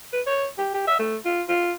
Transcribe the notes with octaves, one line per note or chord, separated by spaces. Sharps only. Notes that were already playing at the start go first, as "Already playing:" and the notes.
B4
C#5
G4
G4
E5
A3
F4
F4